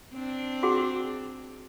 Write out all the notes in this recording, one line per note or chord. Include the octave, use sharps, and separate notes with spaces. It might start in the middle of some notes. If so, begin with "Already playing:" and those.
C4 D4
F#4 G#4 F#5